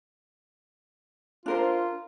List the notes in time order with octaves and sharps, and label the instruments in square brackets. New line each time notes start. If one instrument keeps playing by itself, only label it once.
[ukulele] D4 A#4 C5 [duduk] F4